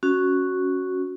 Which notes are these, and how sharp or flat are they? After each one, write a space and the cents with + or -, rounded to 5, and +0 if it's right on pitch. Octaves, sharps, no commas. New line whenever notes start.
C#4 +0 F#4 +0